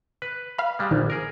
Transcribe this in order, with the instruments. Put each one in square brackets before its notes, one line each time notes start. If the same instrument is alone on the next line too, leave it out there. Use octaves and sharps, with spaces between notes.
[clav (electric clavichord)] B4
[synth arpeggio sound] F5 B5
[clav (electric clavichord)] G3 G#3
[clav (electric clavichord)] A#1 [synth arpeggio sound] D#3
[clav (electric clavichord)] G#4 A#4